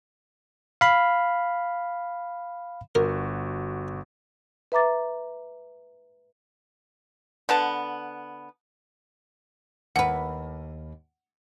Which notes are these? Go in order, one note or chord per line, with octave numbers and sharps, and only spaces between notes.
F5 B5
G1 F#4 A#4
B4 E5 A#5 D6 A6
D3 B3 A5
D#2 B4 F#5